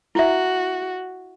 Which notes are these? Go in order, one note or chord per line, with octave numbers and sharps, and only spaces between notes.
E4 F#4 E5